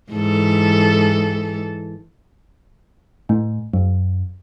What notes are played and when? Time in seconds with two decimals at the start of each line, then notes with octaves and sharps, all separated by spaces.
0.12 G#2 E3 A4
3.29 A2
3.74 F#2